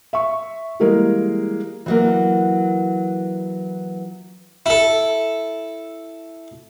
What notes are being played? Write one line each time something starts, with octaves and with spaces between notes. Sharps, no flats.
E5 C#6
E3 G3 G#3 A#3 G#4 A#4
E3 F#3 A#3
E4 A4